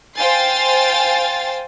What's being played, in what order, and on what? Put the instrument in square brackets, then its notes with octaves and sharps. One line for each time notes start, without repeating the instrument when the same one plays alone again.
[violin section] C5 F5 G5 G#5 A6 C7